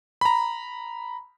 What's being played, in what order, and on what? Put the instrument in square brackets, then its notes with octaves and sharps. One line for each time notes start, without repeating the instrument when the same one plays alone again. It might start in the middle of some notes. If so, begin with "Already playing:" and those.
[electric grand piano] A#5 B5